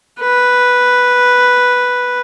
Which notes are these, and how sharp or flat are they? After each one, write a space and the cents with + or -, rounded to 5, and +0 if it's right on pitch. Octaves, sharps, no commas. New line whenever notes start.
B4 +0